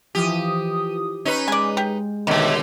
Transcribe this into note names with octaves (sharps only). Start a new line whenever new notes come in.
E3 F3 G4 D#6
C#4 D#4 B4 C#5
G#3 D5 G#5
G4
D#2 B2 D3 D#3 A3